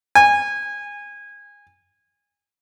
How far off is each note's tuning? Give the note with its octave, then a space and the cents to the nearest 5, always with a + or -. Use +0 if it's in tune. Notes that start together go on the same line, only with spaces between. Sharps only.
G#5 -20